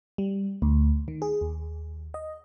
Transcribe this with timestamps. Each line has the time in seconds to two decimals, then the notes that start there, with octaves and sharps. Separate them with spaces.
0.18 G3
0.62 D2
1.08 D#3
1.22 G#4
1.41 D#2
2.14 D#5